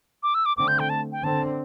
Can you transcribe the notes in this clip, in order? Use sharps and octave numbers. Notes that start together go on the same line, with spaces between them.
D6
E6
D6
D3 A3 C4 D6
G6
G5
A5
G5
D3 C4 A5